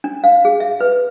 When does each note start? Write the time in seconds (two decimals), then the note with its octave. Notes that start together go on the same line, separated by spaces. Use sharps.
0.04 D4
0.24 F5
0.45 G#4
0.60 E5
0.81 B4